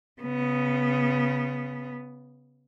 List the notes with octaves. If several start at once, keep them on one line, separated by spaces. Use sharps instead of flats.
C#3 B3